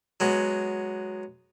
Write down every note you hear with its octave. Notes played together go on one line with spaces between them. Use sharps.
F#3 G#3 B3